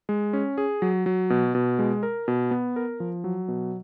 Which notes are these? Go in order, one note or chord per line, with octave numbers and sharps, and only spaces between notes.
G#3
C#4
G#4
F#3
F#3
B2
B2
G#3
A#4
B2
B3
A#4
F3
F#3
B2